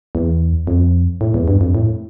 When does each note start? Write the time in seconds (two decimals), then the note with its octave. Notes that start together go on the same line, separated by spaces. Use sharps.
0.15 E2
0.67 F2
1.21 A2
1.34 E2
1.48 G2
1.61 F2
1.75 A2